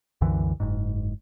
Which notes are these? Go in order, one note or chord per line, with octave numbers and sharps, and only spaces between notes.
C2 F#2 D3 E3
F#1 G#2